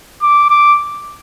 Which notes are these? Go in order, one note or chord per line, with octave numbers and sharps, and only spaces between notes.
D6
D6